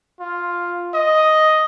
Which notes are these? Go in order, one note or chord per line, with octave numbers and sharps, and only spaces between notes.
F4
D#5